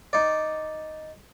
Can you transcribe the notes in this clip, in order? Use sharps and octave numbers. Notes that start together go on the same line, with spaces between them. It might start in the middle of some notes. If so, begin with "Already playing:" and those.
D#4 D5